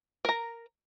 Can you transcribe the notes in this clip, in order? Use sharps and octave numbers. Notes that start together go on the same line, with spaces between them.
A#4 A#5